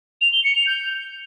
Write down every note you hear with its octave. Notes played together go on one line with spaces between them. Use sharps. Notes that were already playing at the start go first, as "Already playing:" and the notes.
F7
G7
C#7
F7
G6